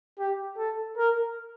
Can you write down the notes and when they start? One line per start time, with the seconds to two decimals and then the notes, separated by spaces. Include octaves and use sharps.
0.19 G4
0.57 A4
0.97 A#4